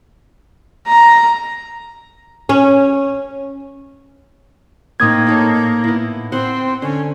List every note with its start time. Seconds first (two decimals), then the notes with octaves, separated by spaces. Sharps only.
0.87 A#5
2.49 C#4
5.00 A2 A#3 C4 D#4 D#6 G#6
5.27 D#4 A4 C#5
5.84 B3 E4
6.32 C4 C5 F#5 C6
6.82 D3 C#4